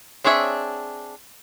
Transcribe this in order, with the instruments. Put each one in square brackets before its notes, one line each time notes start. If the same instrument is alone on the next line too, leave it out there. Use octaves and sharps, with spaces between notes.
[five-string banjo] C4 D4 G#4 C#5 E5